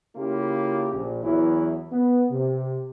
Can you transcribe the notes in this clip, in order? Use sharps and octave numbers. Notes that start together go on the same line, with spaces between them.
C#3 A#3 E4 F4 G4
A#1
E2 E3 F#3 E4
B3
C3